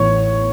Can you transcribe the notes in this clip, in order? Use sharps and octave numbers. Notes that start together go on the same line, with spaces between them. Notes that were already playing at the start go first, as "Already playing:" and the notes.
Already playing: A1 A2 E3 B3 C#5